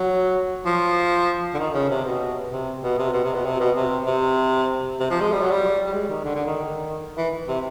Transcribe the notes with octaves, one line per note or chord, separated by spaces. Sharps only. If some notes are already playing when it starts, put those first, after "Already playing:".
Already playing: F#3
F3
D3
D#3
C#3
C3
B2
C3
B2
C3
B2
C3
B2
C3
B2
C3
C3
C3
F3
G#3
G3
F#3
G3
G3
G#3
D#3
D3
D3
D#3
E3
C3